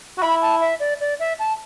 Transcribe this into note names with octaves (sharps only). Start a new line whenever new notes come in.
F#4
E4 B5
A5
E5
D5
D5
E5
A5